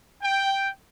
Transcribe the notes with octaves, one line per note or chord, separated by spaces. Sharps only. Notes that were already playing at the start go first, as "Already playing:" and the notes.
G5